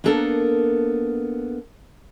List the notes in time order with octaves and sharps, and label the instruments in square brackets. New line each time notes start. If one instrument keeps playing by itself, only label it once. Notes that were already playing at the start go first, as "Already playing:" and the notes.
[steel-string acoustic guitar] A#3 B3 D4 A4 A#4